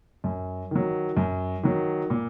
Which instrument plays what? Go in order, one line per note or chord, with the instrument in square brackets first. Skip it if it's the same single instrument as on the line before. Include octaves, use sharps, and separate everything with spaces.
[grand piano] F#2
D#3 F#3
F#2
D#3 F#3
A#2